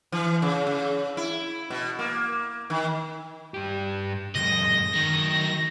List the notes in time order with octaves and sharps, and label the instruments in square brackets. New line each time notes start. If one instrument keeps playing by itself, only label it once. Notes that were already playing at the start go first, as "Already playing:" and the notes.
[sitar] E3
C#3
C#3
E4
B2
A#3
D#3
[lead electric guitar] G2 G4
[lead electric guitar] C#2 F#2 [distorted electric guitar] D#5 [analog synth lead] A#6
[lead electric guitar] D#3 [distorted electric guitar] F#3 A3